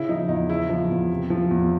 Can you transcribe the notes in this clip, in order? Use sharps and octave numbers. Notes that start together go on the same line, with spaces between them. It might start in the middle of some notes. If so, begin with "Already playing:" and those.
Already playing: C#3 E4
F3 D#4
E2 D#4
C#3 E4
F3
E2
C3
F3
E2